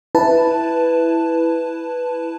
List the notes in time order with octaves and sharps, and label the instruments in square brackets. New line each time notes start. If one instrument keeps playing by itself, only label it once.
[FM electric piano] E4 B4 A5